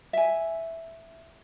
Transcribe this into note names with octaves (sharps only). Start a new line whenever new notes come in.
E5 G#5